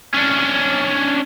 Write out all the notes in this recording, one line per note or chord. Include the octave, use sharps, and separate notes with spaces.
C#4 D4